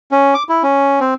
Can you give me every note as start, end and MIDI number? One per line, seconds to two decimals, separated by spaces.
0.11 0.34 61
0.34 0.43 86
0.49 0.63 64
0.63 1.00 61
1.00 1.14 60